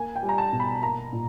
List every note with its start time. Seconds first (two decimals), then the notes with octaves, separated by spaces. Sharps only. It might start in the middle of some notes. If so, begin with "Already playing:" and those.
Already playing: A#3 G#5
0.16 G5
0.23 G3
0.29 A#5
0.38 A5
0.53 B2
0.60 B5
0.82 A#3 A#5
1.13 A#2